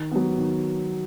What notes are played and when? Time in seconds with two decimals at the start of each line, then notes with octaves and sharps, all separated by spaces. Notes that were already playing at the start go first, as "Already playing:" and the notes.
Already playing: D#3
0.11 F#3 B3
0.38 D#3